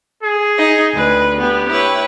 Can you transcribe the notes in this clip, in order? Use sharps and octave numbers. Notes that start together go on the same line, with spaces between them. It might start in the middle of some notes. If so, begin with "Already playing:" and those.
G#4
D#4
D2 B4
B3 G4
E4 B4 C#5